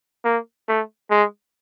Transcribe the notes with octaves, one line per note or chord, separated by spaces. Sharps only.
A#3
A3
G#3